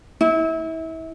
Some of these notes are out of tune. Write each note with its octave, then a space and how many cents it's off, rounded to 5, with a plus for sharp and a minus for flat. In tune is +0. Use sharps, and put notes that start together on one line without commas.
E4 -30